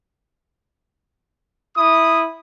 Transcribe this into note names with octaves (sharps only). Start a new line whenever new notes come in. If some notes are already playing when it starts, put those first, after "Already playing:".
E4 D#6